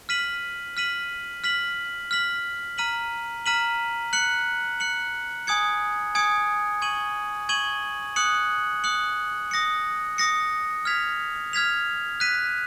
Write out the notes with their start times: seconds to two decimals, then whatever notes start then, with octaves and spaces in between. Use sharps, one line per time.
0.09 F6 B6 D#7 F#7
0.77 F6 B6 D#7 F#7
1.44 F6 B6 F#7
2.11 F6 B6 F#7
2.78 A#5 F6 B6 D#7 F#7
3.46 A#5 F6 B6 D#7 F#7
4.13 F#6 C#7 F#7
4.80 F#6 C#7 F#7
5.47 G#5 D#6 G#6 C#7
6.15 G#5 D#6 G#6 C#7
6.82 C#6 G#6 D#7 F#7
7.49 C#6 G#6 D#7 F#7
8.16 D#6 F#6 C#7 F#7
8.84 D#6 F#6 C#7 F#7
9.51 D#6 A#6 C#7
10.18 D#6 A#6 C#7
10.85 F6 G#6 B6 F7
11.53 F6 G#6 B6 F7
12.20 F#6 B6 D#7